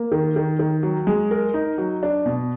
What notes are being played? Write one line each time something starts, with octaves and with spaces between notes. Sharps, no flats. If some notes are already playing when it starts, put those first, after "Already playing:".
Already playing: A#3
D#3
D#3
D#3
F#3
G#3
A#4
D#4
F#3
D4
B2